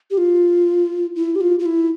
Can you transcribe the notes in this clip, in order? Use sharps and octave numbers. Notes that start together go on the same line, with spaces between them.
G4
F4
E4
G4
F4
F4
E4